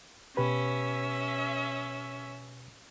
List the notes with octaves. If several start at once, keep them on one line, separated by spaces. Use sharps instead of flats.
B2 C#4 G4 B4 E5